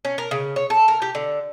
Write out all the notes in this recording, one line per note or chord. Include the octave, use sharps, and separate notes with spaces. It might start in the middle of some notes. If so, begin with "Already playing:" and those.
C#4
A#4
C#3
C#5
A4
A#4
G4
D3